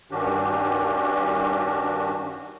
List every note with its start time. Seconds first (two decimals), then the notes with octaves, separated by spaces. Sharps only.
0.11 G2 D#3 C#4 D4 F#4 G4